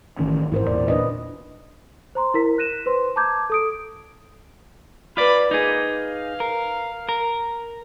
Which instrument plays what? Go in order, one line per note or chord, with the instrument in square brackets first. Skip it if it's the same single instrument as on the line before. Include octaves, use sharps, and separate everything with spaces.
[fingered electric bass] A1 D#3 C#4
[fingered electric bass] A1 G#2 [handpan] E4 A#4 C5
[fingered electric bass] E2 A#2 [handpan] D5
[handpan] D4 B4 D#5
[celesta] C5 A#5 C6
E4 A#4 B6
F#6 A#6 D#7 E7
B4 C5 C6
A5 A#5 D6 G6 G#6
A4 D#6 D7
[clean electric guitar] F4 D5 [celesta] B4 D6 [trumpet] B5
[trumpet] A#3 [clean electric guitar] D#4 G#4
[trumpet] F5
[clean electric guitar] A#4
A#4